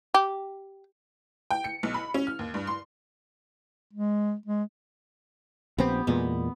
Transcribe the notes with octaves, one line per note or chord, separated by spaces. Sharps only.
G4
G5
C#7
B1
B5
C#4
F6
D#2
G2
C6
G#3
G#3
A#1 B3 C4 G4
E2 A#2 G#3 B3